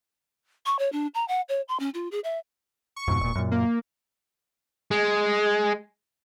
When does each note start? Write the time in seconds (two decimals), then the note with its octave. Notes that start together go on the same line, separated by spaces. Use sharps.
0.66 C#6
0.79 C#5
0.92 D4
1.14 A#5
1.28 F#5
1.49 C#5
1.68 C6
1.80 C#4
1.94 F4
2.11 G#4
2.24 E5
2.96 C#6
3.08 F2 G#2 B2
3.20 E1 A#2
3.35 F#2 A#2
3.51 A#3
4.91 G#3